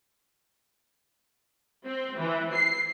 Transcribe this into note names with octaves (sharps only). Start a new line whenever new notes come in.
C4
E3
C7